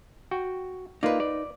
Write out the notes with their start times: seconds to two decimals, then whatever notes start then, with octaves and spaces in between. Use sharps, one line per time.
0.31 F#4 G5
1.03 A#3 D#4 F4 B4 D5
1.20 D5